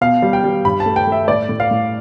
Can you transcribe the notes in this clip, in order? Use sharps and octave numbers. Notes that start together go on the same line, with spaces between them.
B2 F5
G3
G5
G3
G2 B5
A5
A3
G5
A3 E5
A2 D5
A2
F5
A2